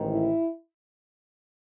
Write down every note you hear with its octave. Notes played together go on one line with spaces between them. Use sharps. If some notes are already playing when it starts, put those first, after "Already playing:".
Already playing: A1 G#2 D#3
E4